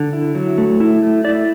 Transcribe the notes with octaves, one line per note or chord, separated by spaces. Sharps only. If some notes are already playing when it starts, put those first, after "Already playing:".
Already playing: D3
E4
F#3
A3
E4
A3
E4 D5